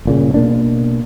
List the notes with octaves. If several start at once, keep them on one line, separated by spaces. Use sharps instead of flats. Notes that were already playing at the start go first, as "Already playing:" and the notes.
G1 A#2 C#3
B2 A#3 D4